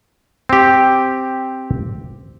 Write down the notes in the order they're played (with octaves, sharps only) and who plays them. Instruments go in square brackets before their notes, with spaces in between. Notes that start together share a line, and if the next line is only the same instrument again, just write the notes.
[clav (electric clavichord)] C4 G4